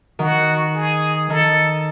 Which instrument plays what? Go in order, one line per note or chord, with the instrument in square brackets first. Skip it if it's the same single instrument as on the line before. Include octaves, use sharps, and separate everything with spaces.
[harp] D#3 [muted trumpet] F#4
[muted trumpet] G#4
[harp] D#3 [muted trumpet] A4